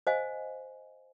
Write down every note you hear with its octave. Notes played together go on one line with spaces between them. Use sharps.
C5 D#5 F5 G#5